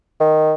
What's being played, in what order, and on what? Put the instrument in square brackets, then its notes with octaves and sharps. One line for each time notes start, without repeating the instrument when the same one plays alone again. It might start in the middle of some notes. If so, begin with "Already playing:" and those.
[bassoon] D#3